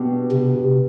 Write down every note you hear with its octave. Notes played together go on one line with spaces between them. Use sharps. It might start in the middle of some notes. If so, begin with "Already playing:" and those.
Already playing: B2 B3 D4 G4
C3